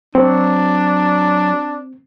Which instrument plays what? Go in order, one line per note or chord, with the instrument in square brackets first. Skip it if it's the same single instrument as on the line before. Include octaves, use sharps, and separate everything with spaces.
[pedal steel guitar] F#3 [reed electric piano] C4 [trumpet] D4